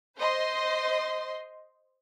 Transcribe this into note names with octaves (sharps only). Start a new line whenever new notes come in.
C5 D#5 C6